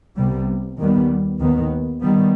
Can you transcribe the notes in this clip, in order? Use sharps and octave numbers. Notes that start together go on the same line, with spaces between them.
C2 C3 G3 B3
D#2 D#3 G3 B3
D#2 D#3 B3
D#3 G3 B3